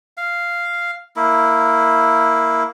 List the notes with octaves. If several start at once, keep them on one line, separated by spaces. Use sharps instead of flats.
F5
A#3 E4